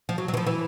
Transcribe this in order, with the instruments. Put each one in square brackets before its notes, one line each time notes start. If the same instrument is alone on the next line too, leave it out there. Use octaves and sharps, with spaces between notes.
[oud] F3
F#3
F#3
E3
F3
E3